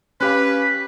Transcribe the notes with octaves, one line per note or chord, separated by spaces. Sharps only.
C#4 G4 B4 F5 F#6 B6